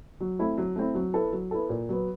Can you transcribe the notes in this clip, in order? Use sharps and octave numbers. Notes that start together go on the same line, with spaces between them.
F#3
A3 C4 E4
F#3
A3 C4 E4
F#3
B3 E4 A4
F#3
B3 E4 A4
A#2
F#3 B3